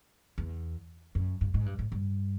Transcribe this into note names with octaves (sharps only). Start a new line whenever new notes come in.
E2
F#2
G2
G#2
G2
G#2
G2